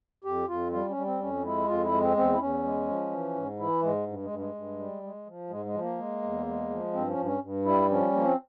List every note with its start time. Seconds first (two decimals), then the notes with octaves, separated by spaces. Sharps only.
0.24 F2 G4
0.48 F2 F4
0.72 G3 F4
0.89 C#4
0.96 G3
1.05 C4
1.20 F2 C#4
1.44 G#3 E4
1.68 F2 F4
1.84 E4
1.92 G#3
2.00 C4
2.17 E2 C4
2.33 E4
2.40 E2 C#4
2.64 G#3
2.88 F3
3.12 E3
3.35 G#2
3.59 E3 E4
3.83 G#2 G#3
4.07 G2
4.23 G#3
4.30 G2
4.39 G#3
4.55 G2
4.79 G3
5.03 G#3
5.26 F3
5.50 G#2 G#3
5.66 G#3
5.74 F3
5.82 A#3
5.99 G#3
6.23 E2
6.46 G#3
6.70 F3
6.93 G2 C4
7.10 C#4
7.18 G2
7.25 C#4
7.42 G2
7.65 G3 E4
7.90 F3 C#4
8.13 F3 A#3
8.24 C4